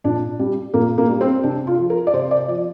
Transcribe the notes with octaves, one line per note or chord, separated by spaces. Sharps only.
A#2 D4
G3
A#2 A#3
A#3
G3
C4
C3 D4
F4
F3
A#4
D5
C3 C5
D5
F3 D5